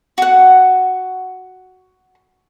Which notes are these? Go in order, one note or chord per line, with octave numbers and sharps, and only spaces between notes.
F#4 F#5